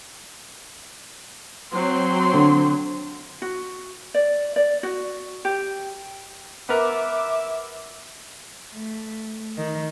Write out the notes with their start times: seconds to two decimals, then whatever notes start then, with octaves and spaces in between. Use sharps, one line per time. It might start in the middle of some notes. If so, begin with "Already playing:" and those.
1.72 F#3 C4 C6
2.33 D3
3.42 F#4
4.14 D5
4.56 D5
4.83 F#4
5.45 G4
6.69 B3 A#4 E5 D6
8.75 A3
9.58 D#3